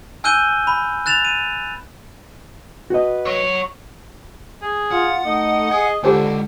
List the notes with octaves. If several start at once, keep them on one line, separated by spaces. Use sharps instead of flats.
G#5 E6 F#6 G6 D#7 G7
B5
F#6 A6 E7 F7
D#7
F#4 B4 D#5
F#3 C#5
G#4
F4 F#5
A3 D#4 D#5
G#4
D3 G#3 F4 G4 C5 G#5